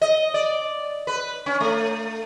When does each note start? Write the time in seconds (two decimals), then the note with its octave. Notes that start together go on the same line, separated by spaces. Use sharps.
0.01 D#5
0.34 D5
1.07 B4
1.46 C#4
1.60 A3